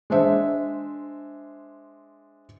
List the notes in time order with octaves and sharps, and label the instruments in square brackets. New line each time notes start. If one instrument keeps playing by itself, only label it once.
[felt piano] G#3 D4 C5 E5